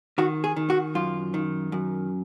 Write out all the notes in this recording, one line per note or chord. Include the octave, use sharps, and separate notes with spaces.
D#3 F#4
G#4
D#3
F#4
F#2 F4
D#3
F#2